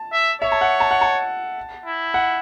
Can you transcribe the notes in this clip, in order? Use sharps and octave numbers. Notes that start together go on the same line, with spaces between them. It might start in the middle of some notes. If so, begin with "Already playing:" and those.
Already playing: A5
E5
C#5 E5
A5
F#5
A5
F#5
A5
E4
F#5